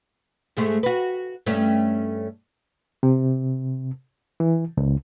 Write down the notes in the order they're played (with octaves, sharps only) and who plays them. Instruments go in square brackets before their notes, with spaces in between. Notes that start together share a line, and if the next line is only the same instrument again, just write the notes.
[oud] G#2 G#3 A3
F#4 B4
G2 A3 C#4
[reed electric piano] C3
E3
C#2